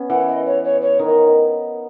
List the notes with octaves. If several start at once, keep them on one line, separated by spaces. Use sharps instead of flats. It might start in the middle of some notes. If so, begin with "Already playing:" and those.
Already playing: B3 C#4
E3 F#5
D#5
C#5
C#5
C#5
D#3
D#5